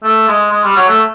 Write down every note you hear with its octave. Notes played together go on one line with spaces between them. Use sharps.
A3
G#3
G#3
G3
F#3
A3